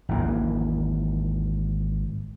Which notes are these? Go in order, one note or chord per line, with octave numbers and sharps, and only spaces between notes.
G#1 E3 A#3